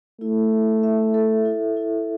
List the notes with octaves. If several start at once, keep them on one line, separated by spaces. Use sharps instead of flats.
A3 E4
E5
E5
A4
E4
E4